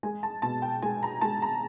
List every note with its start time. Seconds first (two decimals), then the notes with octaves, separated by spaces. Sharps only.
0.03 G#3 G#5
0.23 A5
0.42 B2 A5
0.62 G5
0.82 G#3 G#5
1.03 A#5
1.21 G#3 A5
1.42 A#5